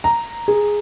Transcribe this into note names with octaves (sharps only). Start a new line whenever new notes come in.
A#5
G#4